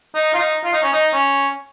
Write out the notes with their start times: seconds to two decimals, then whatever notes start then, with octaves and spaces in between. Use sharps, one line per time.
0.15 D#4
0.34 F4
0.39 D#4
0.64 F4
0.73 D#4
0.83 C#4
0.93 D#4
1.13 C#4